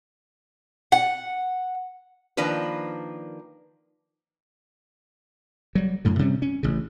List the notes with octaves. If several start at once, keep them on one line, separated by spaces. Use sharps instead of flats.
F#5
D#3 F3 A#3 D4 B4
F#3 G3
F#2 A2 D3
C3 G3 C#4
C#4
A1 C#3